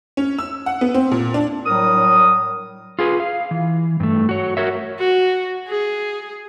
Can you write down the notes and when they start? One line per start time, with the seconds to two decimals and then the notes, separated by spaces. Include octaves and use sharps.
0.17 C#4
0.39 E6
0.66 F#5
0.81 B3
0.94 C4
1.11 A#2
1.34 D4
1.66 A2 F#3 G3 A#4 D#6
2.99 F4 G#4 B4
3.20 F5
3.51 E3
4.00 G2 A3
4.29 F#4 C#5
4.57 F#4 A#4 C#5 E5
4.99 F#4
5.68 G#4